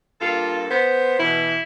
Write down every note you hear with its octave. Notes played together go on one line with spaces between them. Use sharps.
G2 A#3 F4 A4
B3 C5
B2 E3 E4